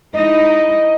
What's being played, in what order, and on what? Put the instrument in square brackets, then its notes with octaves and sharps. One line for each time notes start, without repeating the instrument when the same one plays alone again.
[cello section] G#3 D#4 E4 [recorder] D#5